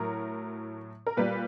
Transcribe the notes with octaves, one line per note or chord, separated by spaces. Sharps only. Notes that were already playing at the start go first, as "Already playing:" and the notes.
Already playing: A2 F#3 A#4
A#4
A#2 G3 B4